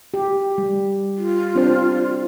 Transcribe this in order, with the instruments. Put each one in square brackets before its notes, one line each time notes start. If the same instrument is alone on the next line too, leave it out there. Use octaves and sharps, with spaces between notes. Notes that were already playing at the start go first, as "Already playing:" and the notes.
[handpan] G4
G3
[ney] F4
[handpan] C4 D4 C5